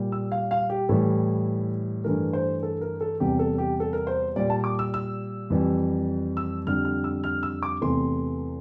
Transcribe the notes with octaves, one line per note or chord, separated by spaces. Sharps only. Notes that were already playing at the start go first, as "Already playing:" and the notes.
Already playing: A#2 G3
E6
F5
F5
G4
A2 E3 G3 A4
G2 E3 A3 A#4
C5
A4
A#4
A4
E2 C3 G3 G4
A4
G4
A4
A#4
C5
A#2 G3 D5
A5
D6
E6
E6
F2 E3 G3
E6
F2 D3 G3 F6
F6
E6
F6
E6
D6
E2 C3 E3 A3 C6